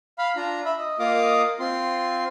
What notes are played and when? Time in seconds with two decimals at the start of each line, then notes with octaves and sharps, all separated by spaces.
0.18 F5 B5
0.36 D4 F4 A#5
0.65 E5 B5
0.78 D#5
0.99 A#3 F4 D#5 F5 D6 D#6
1.60 C4 F4 C6